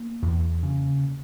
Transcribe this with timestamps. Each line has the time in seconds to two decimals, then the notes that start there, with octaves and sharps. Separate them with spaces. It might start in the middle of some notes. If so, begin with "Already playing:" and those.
Already playing: A#3
0.22 E2
0.63 C#3